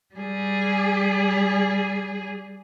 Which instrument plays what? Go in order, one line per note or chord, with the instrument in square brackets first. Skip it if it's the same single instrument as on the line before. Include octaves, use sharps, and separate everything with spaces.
[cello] G3 G#4